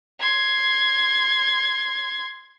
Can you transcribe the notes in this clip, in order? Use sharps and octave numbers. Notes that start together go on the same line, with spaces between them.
C6 G#6